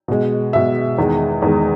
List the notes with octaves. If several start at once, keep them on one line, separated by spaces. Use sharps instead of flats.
B2 G#3
B2 G#3 E5
E2 D#3 G#3
E2 D#3 G#3